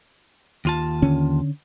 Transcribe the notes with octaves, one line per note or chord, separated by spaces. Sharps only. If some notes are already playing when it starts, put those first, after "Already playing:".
D#2 F4 A5
D3 C#4